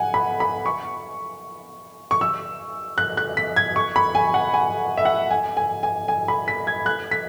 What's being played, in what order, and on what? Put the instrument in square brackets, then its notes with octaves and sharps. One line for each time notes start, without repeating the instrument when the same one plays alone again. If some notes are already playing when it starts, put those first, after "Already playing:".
Already playing: [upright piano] F#5 G#5
B5
B5
C#6
C#6
E6
F#6
F#6
B6
G#6
C#6
B5
G#5
F#5
G#5
E5
F#5
G#5
G#5
G#5
G#5
B5
B6
G#6
F#6
B6